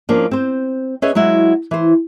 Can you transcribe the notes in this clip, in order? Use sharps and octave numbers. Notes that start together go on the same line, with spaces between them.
F3 A#3 C#4 D4
C4 C5
C#4 G#4 B4 C#5 D#5 E5
F#3 G#3 E4 F#4
E3 C5